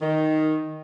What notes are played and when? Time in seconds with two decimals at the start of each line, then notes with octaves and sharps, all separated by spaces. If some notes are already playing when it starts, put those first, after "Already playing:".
0.01 D#3